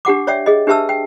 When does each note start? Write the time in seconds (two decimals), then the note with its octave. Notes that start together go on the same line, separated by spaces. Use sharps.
0.05 D4 G4 F#5 D6
0.27 C#5 D5 E5 G5
0.46 G#4 D#5
0.67 D4 G4 B4 E5 A5 E6
0.89 G5